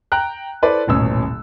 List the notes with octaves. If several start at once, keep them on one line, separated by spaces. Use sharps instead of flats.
G5 A#5 F#6
E4 A4 B4 C5 D5
D#1 A1 B2 C#4 E6